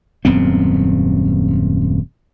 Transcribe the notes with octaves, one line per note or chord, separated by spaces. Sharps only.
D#1 F#2 B3 C4